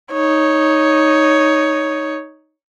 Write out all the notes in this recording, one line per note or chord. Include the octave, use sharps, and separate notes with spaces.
D#4 C#5